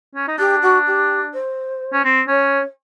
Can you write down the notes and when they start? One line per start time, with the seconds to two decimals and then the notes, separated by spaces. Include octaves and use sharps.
0.15 C#4
0.28 D#4
0.38 D4 G4
0.62 F#4
0.86 G4
1.33 C5
1.93 C#4
2.04 C4
2.28 C#4 C#5